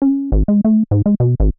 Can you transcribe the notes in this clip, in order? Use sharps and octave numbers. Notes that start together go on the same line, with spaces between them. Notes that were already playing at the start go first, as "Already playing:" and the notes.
C#4
G#1
G#3
A3
G#2
G#3
B2
G#1